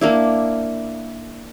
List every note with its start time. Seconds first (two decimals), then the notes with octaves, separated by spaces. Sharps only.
0.01 A#3 D4 E4